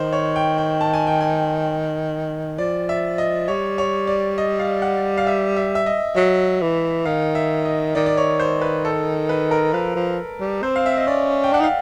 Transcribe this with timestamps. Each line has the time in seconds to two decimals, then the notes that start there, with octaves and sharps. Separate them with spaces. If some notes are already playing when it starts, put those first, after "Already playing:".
Already playing: D#3 C5
0.13 C#5
0.36 G5
0.58 G5
0.81 A5
0.94 G#5
1.07 G5
1.21 G#5
2.58 F3 D5
2.89 E5
3.18 D#5
3.48 G3 C#5
3.78 C#5
4.07 D5
4.38 D#5
4.59 F5
4.82 F#5
5.18 F5
5.27 E5
5.56 E5
5.75 E5
5.86 D#5
6.16 F#3 E5
6.61 E3
7.05 D#3 F5
7.35 E5
7.65 D#5
7.95 D#3 D5
8.06 D5
8.17 C#5
8.40 C5
8.61 B4
8.85 A4
9.29 B4
9.51 A#4
9.73 F3 B4
9.95 F3
10.40 G3
10.62 C4 C5
10.76 F5
10.86 E5
10.97 D#5
11.07 C#4 D5
11.44 G5
11.52 D4 F#5
11.60 D#4
11.64 F5